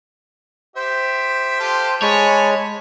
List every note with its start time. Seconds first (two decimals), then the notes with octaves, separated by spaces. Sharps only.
0.76 G4 C5 E5
1.60 F4 G4 A4
2.02 G#3 C#5 G#5 A5 B5